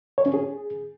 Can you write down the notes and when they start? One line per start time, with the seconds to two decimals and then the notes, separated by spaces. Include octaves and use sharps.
0.18 C#5
0.26 C#4
0.34 G#4